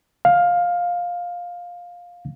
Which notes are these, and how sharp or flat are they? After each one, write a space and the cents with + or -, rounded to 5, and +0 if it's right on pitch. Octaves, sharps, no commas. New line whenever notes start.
F5 +15